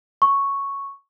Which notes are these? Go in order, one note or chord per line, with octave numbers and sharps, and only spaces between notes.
C#6